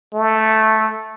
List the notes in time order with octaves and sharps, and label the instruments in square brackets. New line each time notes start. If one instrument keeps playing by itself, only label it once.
[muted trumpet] A3